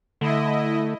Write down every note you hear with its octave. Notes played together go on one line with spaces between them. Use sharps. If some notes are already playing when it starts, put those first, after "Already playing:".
D3 A3 E4 D#5